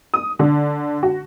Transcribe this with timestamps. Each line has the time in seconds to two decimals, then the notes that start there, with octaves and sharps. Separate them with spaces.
0.14 D#6
0.39 D3
1.03 F#4